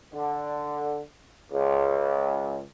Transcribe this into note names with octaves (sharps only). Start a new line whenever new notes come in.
D3
C#2